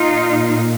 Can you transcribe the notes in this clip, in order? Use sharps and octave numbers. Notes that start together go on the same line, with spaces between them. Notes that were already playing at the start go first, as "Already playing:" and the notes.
Already playing: A#2 D#4 F4